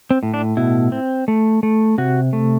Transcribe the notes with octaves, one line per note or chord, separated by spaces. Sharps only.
C4
A2
D4
B2 E4
C4
A3
A3
C3 F#4
A3